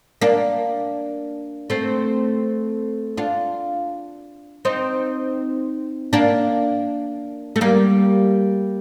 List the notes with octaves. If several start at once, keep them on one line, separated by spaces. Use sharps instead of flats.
A#3 D4
A3 C4
D4 F4
C4 D#4
A#3 D4
A3
G3 A#3